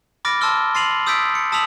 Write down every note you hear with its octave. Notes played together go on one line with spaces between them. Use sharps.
B5 D6 F6 A6 A#6 D7
A5 C6 E6 F6 G7
C6 A6 C7 D#7 F7 F#7
D#6 E6 G6 A6 B6 D7
C#7
A5 D#6 E6 B6 F7 F#7